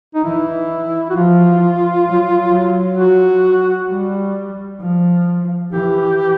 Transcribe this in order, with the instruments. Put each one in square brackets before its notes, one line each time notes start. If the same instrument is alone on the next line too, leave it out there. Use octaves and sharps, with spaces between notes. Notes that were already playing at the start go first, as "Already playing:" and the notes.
[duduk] D#4
[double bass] E3 [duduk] E4
[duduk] F#4
[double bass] F3 [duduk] F4
[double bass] F#3
F#3
[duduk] F#4
[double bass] G3
F3
[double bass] E3 [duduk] G4